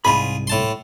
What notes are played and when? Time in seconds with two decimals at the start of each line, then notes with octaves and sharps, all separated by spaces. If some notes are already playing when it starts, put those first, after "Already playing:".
0.05 C2 G#2 F4 G#4 B5
0.47 A2 A5 C6